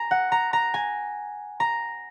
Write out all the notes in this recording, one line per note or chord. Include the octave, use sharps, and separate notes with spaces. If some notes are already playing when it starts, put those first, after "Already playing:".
Already playing: G#5 A#5
F#5
A#5
A#5
G#5
A#5